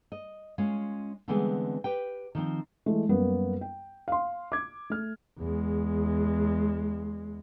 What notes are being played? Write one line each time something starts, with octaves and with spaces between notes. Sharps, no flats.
D#5
G#3 C#4 F4 C#5 F5
D3 E3 G3 G#3 B3 C4
G4 B4 G5
D#3 F3 C4
E3 G#3 A3
F#2 G3 A#3 B3
G5
F5 C6
D6 G#6
A3 F6
E2 G#3